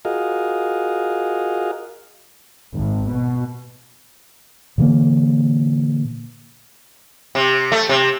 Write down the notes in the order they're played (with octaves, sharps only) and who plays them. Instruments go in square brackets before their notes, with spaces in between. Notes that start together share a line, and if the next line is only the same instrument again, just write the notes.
[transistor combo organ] F4 F#4 G#4 A#4 D#5 F5
[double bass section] G#1
B2
[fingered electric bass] A#2 D3 E3 A#3
[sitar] C3
A3
C3